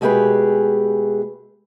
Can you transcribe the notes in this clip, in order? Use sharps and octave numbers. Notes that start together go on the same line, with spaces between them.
B2 G#3 A3 G4 G#4 B4